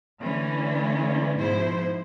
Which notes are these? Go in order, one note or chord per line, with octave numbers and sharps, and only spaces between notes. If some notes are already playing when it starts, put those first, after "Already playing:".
D3 E3 A3 C#4
G#2 B2 F3 E4 C5